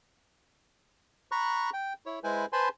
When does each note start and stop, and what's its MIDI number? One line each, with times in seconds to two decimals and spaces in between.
1.32 1.70 82
1.32 1.70 83
1.32 1.70 85
1.32 1.70 90
1.73 1.93 79
2.06 2.19 64
2.06 2.19 73
2.24 2.46 56
2.24 2.46 64
2.24 2.46 71
2.24 2.46 72
2.24 2.46 80
2.53 2.69 71
2.53 2.69 72
2.53 2.69 80
2.53 2.69 81
2.53 2.69 83
2.53 2.69 84